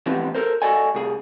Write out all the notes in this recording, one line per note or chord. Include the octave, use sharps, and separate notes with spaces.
B2 E3 F3 G3 B3 C4
A4 A#4 C5
F#4 A4 D5 D#5 G#5
C2 G#4